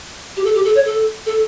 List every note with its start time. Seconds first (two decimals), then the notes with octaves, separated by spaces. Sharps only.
0.37 G4
0.45 A4
0.55 G4
0.65 A4
0.75 C#5
0.85 A4
1.26 A4